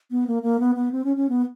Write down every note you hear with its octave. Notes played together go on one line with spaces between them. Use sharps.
B3
A#3
A#3
B3
B3
C4
C#4
C#4
B3